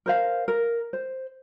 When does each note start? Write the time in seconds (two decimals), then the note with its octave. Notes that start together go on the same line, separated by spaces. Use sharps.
0.06 A#4 C5 F5
0.48 A#4
0.93 C5